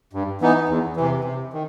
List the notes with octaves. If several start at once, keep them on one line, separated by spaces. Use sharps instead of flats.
G2
E3 B3 D#4
E2
C3 E3
C3
D#3